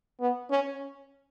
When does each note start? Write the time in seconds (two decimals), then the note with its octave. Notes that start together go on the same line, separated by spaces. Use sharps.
0.20 B3
0.50 C#4